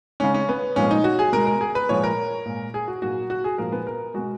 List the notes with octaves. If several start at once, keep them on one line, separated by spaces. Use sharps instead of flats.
C#3 G#3 C#4
C#4
B3
A#2 F3 G#3 C#4
D#4
F#4
G#4
B2 G#3 A#4
A#4
G#4
B4
A#2 F3 G#3 C#5
A#4
A#2 G#3
G#4
F#4
A#2 F#3 F#4
F#4
G#4
A#2 F3 G#3 A#4
B3
A#4
B2 G#3 F#4